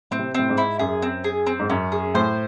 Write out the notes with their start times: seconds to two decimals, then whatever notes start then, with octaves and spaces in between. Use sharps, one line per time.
0.11 A2 C4
0.19 C3
0.34 A2 C4
0.49 G#2
0.57 E4
0.79 F#2 G#4
1.02 C4
1.24 G#4
1.47 C4
1.59 G#2
1.70 F#2 C#4
1.92 G#4
2.14 A2 C5